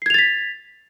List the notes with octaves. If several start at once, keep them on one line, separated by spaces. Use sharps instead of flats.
G#6 A6 B6 C7 F7